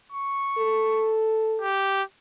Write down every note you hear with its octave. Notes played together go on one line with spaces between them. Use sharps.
C#6
A4
G4